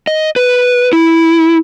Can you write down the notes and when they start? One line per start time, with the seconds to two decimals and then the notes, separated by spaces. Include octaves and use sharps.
0.07 D#5
0.36 B4
0.93 E4